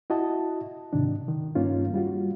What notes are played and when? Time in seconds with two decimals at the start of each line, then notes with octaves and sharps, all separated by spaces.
0.10 E4 F#4 D#5 A5
0.93 G#2 C3 D#3 D4
1.28 D#3
1.55 G2 A#3 C#4 D#4 F4
1.94 G3 F4 F#4